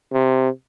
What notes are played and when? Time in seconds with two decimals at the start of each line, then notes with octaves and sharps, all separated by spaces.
0.13 C3